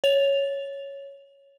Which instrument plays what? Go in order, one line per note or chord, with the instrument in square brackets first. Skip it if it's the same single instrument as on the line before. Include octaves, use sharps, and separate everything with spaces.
[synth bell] C#5 F7